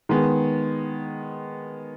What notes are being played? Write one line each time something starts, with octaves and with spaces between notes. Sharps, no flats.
D#3 G#3 B3